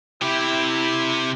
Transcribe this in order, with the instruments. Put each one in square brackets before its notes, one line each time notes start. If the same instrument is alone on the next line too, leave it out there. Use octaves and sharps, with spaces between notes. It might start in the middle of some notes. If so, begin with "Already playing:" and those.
[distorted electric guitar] C3 G4 [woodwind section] E4